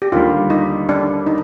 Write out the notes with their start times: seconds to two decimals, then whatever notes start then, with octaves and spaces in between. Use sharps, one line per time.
0.02 G4
0.12 D#2 D3 G3 F4
0.50 D#4
0.89 D4
1.27 D#4